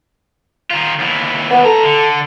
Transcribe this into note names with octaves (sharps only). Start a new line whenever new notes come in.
D#3 F4
D#2 E3
B3
A2 A4 A#5
D3